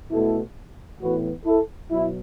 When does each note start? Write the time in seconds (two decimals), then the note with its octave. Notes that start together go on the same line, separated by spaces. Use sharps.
0.11 B2 A3 E4 A4
1.01 A2 E3 B3 F#4 B4
1.46 E4 A4
1.91 B2 F#3 E4